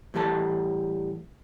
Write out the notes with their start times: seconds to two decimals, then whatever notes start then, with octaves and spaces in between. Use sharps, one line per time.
0.14 A2 E3 G3 A4 A5